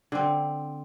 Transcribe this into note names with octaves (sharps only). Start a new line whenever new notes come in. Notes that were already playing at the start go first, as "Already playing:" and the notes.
D3 C4